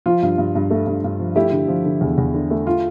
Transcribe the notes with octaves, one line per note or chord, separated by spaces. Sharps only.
F3 F4
G2
G2
G2
A3
G2
G2
F3
A3 E4 G4
D3
F3
D3
E2
E2
D3
A3
F4